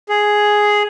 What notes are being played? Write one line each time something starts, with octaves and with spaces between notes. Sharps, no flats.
G#4